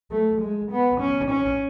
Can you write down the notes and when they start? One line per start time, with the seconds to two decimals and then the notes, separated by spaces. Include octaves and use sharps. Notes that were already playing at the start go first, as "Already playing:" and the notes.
0.11 A3
0.41 G#3
0.71 B3
1.00 C#4
1.31 C#4